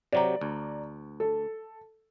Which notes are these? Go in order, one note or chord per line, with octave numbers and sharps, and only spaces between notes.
C3 F#3 G4 D5 A#5
D2
A4